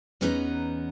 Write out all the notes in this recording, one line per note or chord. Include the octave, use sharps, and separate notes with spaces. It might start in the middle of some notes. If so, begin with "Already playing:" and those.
E2 B3 C#4 D#4 B4 A#5